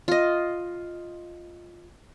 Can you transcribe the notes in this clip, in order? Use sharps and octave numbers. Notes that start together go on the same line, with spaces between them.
F4 D#5